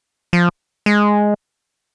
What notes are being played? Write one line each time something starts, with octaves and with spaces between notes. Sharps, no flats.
F3
G#3